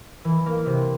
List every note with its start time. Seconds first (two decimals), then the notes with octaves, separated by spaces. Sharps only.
0.25 E3
0.46 A#3
0.66 C3